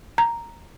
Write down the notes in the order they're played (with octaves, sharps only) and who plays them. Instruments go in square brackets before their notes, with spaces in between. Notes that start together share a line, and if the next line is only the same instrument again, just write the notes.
[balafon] A#5